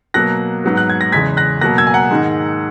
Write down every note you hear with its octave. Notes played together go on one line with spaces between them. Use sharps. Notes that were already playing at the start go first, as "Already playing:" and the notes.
B2 F#3 A#3 F#6 A#6
G#2 F#3 B3
F#6
G#6
A#6
E2 C#3 G#3 G#6 B6
F#6 A#6
B2 F#3 A#3 F#6 A#6
E6 G#6
G#5
F#5 A#5
G#2 D#3 G#3